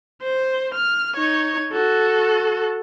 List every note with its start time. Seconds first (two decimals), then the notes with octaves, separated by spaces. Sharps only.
0.22 C5
0.74 F6
1.16 D#4 C#5
1.72 F#4 A4